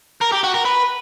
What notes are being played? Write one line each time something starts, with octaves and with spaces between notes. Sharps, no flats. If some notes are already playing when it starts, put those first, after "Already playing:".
A#4
G4
F#4
A#4
B4